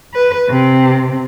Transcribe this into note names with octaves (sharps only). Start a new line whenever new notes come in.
B4
C3